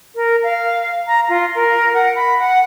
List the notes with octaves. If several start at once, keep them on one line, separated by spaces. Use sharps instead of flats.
A#4
F5
A#5
F4
A#4
F#5
B5
F#5